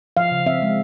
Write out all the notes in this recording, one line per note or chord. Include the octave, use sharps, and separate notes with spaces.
F3 F5
C#3
C4 E5
G#3